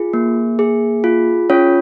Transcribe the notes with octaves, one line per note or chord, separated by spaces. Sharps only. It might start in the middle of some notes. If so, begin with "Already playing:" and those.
Already playing: F4 G#4
A#3
G#4
F4
C#4 F4 C#5